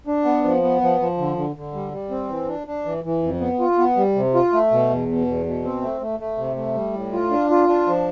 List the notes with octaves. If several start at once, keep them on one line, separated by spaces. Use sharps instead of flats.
D4
B3
F3
B3
F3
F3
D3
D3
D3
G3
G3
C4
E3
D4
D4
E3
E3
F2
B3
F4
B3
G3
C3
F4
A3
B2
E2
B2
E2
B2
C4
A3
A3
A3
C3
A3
G3
A2
F4
D4
F4
D4
F3